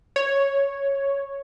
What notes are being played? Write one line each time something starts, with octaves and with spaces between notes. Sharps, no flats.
C#5